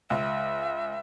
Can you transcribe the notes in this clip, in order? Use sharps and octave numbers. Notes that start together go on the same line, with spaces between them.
C#2 E5